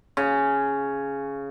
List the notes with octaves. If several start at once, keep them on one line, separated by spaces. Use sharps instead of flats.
C#3